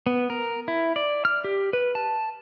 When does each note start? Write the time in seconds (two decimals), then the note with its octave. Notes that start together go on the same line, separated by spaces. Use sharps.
0.06 B3
0.30 A#4
0.68 E4
0.96 D5
1.25 F6
1.44 G4
1.73 B4
1.95 A5